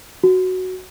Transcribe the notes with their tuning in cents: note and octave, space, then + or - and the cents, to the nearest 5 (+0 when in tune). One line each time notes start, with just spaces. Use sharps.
F#4 +0